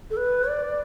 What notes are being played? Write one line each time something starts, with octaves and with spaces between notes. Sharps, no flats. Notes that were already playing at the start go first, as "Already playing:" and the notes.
A4
B4
D5